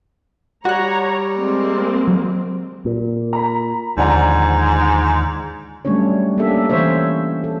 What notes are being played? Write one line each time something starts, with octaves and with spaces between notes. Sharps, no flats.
G3 F#4 C#5 A#5 F#6
G#3 A#3 C4
F#3
A#2
A#5 B5
D#2 G#2 D3 F3 D5 F#5 A#5
F#3 G3 A3 C#4 D4 C#5
A#3 C#4 D4 G4 A4 E5
E3 C#4 C5 C#5 E5
A4